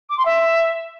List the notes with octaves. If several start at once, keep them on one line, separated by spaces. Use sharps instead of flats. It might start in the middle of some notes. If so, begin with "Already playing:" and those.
D6
C6
E5